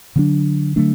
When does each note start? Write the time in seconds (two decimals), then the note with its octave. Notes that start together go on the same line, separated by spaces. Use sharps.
0.16 D3 F#3 A3 D4
0.76 D3 F#3 A3 D4